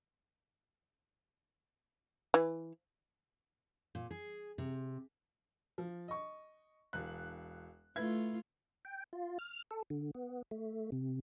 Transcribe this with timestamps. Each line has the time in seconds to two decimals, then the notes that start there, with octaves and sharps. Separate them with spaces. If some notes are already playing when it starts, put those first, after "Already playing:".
2.34 E3
3.95 A#2
4.11 G#4
4.58 C3
5.78 F3
6.08 D#5 C#6
6.93 E1 F#6
7.96 A3 E4 F4 B4 G#6
8.85 G5
9.13 F4
9.39 F6
9.71 A4
9.90 D3
10.15 B3
10.51 A3
10.92 C3